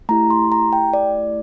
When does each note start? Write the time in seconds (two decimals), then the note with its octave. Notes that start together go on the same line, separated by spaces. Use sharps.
0.09 A3 E4 G4 A#5
0.30 C6
0.52 A#5
0.73 G5
0.93 D5